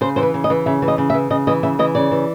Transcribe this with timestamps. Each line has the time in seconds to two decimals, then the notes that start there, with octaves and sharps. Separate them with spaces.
0.01 C#3 C5
0.16 E3 C5
0.23 B4
0.34 C#3
0.44 D#5
0.50 E3
0.66 C#3 E5
0.82 E3
0.88 D#5
0.98 C#3
1.10 E5
1.14 E3
1.30 C#3 D#5
1.47 E3 D#5
1.63 C#3 E5
1.79 E3 D#5
1.95 C#3 D5
2.11 E3